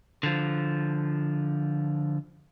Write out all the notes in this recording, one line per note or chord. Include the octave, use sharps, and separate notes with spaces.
D3 F3